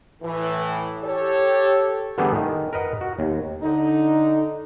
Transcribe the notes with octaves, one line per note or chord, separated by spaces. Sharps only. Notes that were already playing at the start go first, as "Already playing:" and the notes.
A2 E3
G4 A4 C#5
D3 E3 G3 A3 B3 G#4
D#3
A#4 B4 D#5 F#5
F#4
D#2
D3 D#4